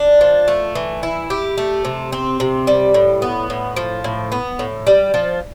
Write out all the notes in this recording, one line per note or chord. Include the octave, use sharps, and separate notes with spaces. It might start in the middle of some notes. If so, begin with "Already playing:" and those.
Already playing: D4
F3
A3
E3
E4
G4
A3
C3
C4
C3
G3
A2
B3
A2
F3
A2
B3
A2
G3
F3